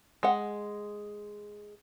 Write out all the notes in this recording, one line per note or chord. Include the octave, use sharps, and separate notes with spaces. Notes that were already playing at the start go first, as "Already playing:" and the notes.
G#3 F#5